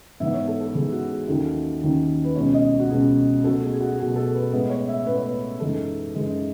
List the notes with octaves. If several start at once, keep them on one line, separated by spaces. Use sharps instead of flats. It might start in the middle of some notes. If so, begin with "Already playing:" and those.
G#2 E3 B3 E5
C#5
A4
A4
G#2 E3 B3 G#4
F#4
G#4
D#2 D#3 F#3 C#4 A4
D#2 D#3 F#3 C#4
B4
C#2 B2 G#3 C#4 C#5
D#5
F#4
C#2 B2 G#3 C#4 G#4
B2 F#3 A3 A4
G#4
G#4
F#4
B2 F#3 A3 G#4
A4
B4
A2 G#3 B3 B4
C#5
E5
A2 G#3 B3 B4
C#5
B4
F#2 E3 G#3 D#4 A4
F#2 E3 G#3 D#4